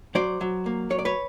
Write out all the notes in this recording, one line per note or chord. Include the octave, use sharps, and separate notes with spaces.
F#3 C5 D5
F#3
A#3
F#3 C#5
D5
B4 C#5